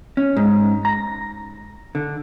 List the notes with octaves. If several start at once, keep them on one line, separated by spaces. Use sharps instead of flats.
C#4
G#2
A#5
D3